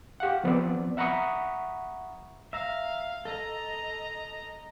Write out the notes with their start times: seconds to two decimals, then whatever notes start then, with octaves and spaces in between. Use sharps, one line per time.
0.20 G4 F5 F#5
0.44 F3 B3 C4 D5
0.97 E5 F#5 A#5 B5 C#6 D#6
2.53 E5 F5 A#5
3.25 A4 D#5 A#5